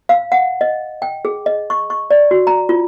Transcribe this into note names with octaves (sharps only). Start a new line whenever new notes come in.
F5
F#5
D#5
G5
G#4
D#5
C#6
C#6
D5
F#4
A#5
F4